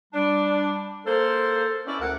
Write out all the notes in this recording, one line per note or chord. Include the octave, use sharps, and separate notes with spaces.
G3 D4
A#3 A4 C5
B3 C#4 E4 D5
D2 G#3 A#4 F#5